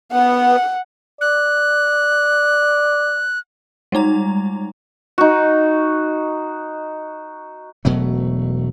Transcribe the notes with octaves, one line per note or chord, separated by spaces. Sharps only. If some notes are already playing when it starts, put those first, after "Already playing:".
B3 F#5
D5 F#6
G3 G#3 D#4 A#5
D#4 F#4
E1 B2 F#3 A3